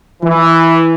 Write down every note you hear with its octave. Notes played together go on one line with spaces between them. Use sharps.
E3